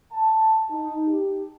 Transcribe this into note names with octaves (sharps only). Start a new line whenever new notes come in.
A5
D#4
G4